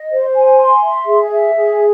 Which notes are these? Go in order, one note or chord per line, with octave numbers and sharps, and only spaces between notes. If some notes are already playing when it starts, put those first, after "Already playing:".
Already playing: D#5
C5
G#5
C6
E5
G#4
E5
G#4